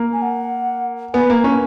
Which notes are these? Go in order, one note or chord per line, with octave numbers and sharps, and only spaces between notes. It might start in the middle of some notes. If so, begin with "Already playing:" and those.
Already playing: A#3
G#5
F#5
B3 G#5
A#3
C#4